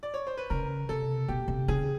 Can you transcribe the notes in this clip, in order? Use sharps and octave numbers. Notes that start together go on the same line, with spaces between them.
D5
C#5
C5
B4
C#3 A#4
C3 A4
B2 G4
C3
C#3 G#4